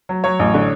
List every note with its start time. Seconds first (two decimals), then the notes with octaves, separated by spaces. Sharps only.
0.09 F#3
0.24 F#3 C#5
0.39 A1
0.54 D3